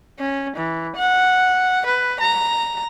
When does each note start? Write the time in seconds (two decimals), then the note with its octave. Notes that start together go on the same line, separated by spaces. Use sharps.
0.19 C#4
0.56 E3
0.96 F#5
1.86 B4
2.20 A#5